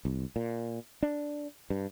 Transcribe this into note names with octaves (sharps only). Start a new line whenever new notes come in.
C2
A#2
D4
G2